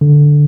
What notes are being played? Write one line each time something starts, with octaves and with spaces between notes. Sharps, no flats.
D3